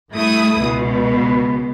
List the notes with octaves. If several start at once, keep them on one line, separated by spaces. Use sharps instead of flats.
G2 A3 E4 D#6
C#2 B2